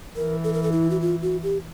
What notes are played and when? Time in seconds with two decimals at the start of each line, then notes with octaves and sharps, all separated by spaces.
0.16 E3 A#4
0.44 A4
0.53 A#4
0.63 A4
0.72 E4
0.90 F#4
1.01 F4
1.22 F#4
1.43 G4